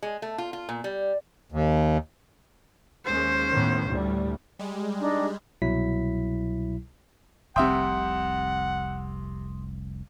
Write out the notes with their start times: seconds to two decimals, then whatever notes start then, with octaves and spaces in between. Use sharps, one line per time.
0.03 G#3
0.22 A3
0.38 F4
0.53 F4
0.69 A#2
0.84 G3
1.52 D#2
3.06 D#2 G#3 C#4 C5
3.51 A2 D#3 B3
3.88 D2 A2 G3
4.59 G3 G#3
5.00 D4 D#4
5.62 C2 B2 F#3 E4 B6
7.56 F1 C2 C3 E5 F#5 G5 C6 D#6